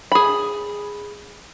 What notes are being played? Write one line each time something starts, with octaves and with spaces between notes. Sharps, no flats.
G#4 B5